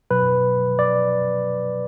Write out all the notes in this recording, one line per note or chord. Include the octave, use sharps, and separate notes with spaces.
B2 F#3 B4
D5